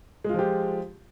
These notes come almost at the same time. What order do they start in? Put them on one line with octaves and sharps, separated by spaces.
G#3 F4 F3 G4